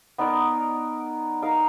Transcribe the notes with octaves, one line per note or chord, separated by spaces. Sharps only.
B3 D#4 A#4 D5
D#4 A#4 F5